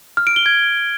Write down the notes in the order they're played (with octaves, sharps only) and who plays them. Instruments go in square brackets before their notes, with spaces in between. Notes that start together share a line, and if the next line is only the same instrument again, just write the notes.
[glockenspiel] F6
D7
G7
G#6